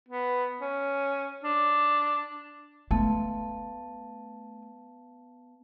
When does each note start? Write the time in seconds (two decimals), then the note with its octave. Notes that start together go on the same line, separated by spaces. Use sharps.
0.09 B3
0.61 C#4
1.44 D4
2.91 A3 B3 A5